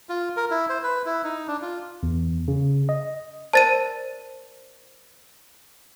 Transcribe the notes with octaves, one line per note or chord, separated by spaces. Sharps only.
F4
A#4
E4
C5
B4
E4
D#4
D4
F4
E2
C#3
D#5
A#4 C5 D5 A5 A6 D#7